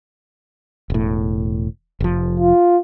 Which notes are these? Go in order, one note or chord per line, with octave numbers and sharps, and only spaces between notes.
E1 A2
F1 F3
F4